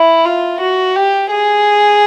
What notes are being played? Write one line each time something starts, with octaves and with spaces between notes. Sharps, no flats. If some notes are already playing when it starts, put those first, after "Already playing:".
Already playing: E4
F4
F#4
G4
G#4